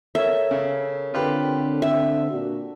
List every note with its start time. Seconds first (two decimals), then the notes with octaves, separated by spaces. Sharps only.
0.15 A4 A#4 C#5 E5
0.51 C#3
1.14 D3 C4 F4 G4 B4
1.82 E5
2.31 A#2 D4 F#4